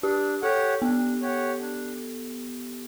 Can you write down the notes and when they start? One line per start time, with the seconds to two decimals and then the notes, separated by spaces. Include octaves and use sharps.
0.03 D4 G4
0.42 G4 A4 C#5 F#5
0.82 B3 D4
1.22 G4 C#5 F#5
1.61 D4